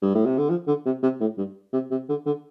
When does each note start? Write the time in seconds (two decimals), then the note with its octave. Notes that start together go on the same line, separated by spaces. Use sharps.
0.02 G2
0.15 A2
0.26 C3
0.38 D3
0.50 F3
0.68 D3
0.86 C3
1.03 C3
1.21 A2
1.38 G2
1.73 C3
1.91 C3
2.09 D3
2.26 D3